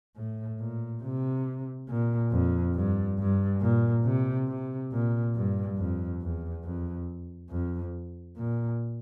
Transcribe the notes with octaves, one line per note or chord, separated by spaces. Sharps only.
A2
A#2
C3
A#2
F2
G2
G2
A#2
C3
C3
A#2
G2
F2
E2
F2
F2
A#2